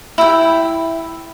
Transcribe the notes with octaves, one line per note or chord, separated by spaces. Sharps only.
E4 G5